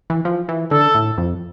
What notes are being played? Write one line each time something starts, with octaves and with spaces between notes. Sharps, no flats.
E3
F3
E3
D3 A4
A2
F2